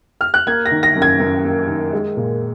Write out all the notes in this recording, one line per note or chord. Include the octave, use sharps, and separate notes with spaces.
F6
F#6
A#3 G#6
A#6
D#3
A#6
F#2
G#6
F#2
A#3
D#3
G#3
A#2